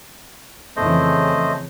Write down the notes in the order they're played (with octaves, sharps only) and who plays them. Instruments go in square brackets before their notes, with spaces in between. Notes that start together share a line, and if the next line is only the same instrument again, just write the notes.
[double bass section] F2 C#3 E3 [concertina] A3 C5 D#5